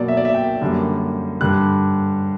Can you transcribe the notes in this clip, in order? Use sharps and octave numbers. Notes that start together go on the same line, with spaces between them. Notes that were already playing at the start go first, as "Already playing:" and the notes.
Already playing: B2 F#3 A#3 D5
E5
D5
E5
G5
F#2 D3 G3 A#3
G2 D3 G3 F#6